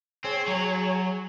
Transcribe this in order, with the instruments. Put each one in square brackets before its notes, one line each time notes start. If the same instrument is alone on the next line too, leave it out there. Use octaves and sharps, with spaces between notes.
[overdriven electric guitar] C4 [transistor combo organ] G#4 C#5 G#5
[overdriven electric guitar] F#3